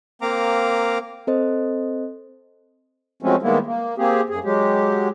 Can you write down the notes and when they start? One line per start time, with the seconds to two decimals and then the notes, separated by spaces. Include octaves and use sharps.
0.22 A#3 C4 F5 A#5 D6
1.27 C4 A4 C5 D#5
3.23 F3 F#3 G#3 A3 C4 C#4
3.42 D#3 G3 G#3 A#3 B3 E4
3.66 A#3
3.98 A#3 C4 G4 G#4
4.29 F#2 G#4
4.44 F#3 G#3 G4